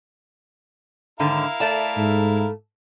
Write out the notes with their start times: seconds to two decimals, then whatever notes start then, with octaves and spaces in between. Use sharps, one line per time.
1.20 G#2 D3 D#3 E4 A#4 F5
1.60 A3 D5 A5
1.97 G#2